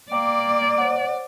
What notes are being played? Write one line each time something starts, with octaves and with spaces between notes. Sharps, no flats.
A#3 D5 G5 D6
C5 C#5 F#5